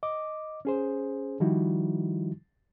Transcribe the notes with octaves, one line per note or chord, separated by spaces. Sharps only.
D#5 D6
C#4 G#4 C5
D#3 F3 G3 D#4 E4 F#4